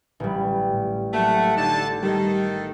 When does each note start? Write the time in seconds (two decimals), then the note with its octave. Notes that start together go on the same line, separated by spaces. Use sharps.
0.20 A1 G3
0.73 A2
1.13 F#3 A3 A#3 F#5
1.57 D3 D#4 A5
2.03 D#3 G3 G4 A4